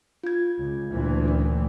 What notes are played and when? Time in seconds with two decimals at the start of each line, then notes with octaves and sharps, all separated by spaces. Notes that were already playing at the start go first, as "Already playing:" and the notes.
0.24 F4 G#6
0.59 C#2
0.92 D2 A#2 E3
1.28 C#4